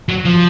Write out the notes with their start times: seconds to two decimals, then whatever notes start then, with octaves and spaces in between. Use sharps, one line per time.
0.09 F#3
0.25 F3